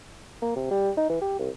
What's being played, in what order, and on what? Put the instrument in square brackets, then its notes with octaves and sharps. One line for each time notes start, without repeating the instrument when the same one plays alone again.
[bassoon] A#3
C3
G3
D#4
E3
G4
C2